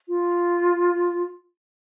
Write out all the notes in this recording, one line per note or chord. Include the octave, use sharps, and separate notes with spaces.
F4